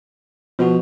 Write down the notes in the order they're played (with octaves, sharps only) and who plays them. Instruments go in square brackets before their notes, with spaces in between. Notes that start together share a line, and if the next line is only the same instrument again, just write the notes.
[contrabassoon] B2 [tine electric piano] F3 F#4